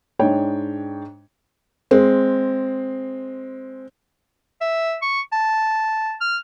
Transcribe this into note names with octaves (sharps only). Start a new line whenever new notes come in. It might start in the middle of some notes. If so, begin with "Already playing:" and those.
G#2 G#3 D4 C#5 G5
G#3 C4
E5
C#6
A5
F6